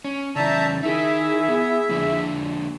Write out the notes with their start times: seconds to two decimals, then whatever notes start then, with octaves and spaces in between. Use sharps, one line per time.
0.04 C#4
0.36 C#3 E3 D5 E5 A5 A#5 G6
0.83 D#4 E4 G#4 A#4 E5
1.49 B3
1.89 D3 F3 A#3